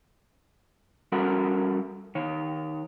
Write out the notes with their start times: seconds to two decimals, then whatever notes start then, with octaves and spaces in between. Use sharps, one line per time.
1.12 G3 C#4 F#4 A4 A#4 F#5
2.15 D#3 C#5